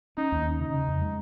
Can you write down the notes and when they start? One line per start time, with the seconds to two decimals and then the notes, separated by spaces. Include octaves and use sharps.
0.17 C#4 D#4
0.32 D#2
0.46 C#4
0.60 C#3 D#4
0.74 C#3
0.88 F2
1.01 G#3